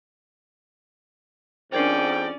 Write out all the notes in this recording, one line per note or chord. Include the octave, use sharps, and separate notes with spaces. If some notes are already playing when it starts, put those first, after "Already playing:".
F2 G#2 C#4 D4 A#4 C5 D5 G5